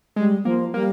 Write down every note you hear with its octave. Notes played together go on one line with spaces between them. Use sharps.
G3 G#3
F3 A#3
G3 A#3